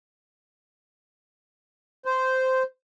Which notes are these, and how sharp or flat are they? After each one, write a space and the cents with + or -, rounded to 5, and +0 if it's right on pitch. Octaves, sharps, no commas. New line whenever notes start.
C5 -10